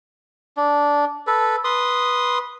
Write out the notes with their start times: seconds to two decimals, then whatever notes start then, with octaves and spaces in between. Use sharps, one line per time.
0.57 D4
1.27 A4 B4
1.64 B4 C6 D#6